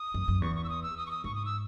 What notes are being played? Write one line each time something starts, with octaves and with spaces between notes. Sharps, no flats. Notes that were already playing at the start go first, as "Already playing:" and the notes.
Already playing: D#6
F#2
F#2
E2 C#6
C#6
E6
D#6
E6
D#6
C#6
D#6
G#2 C#6
D#6
E6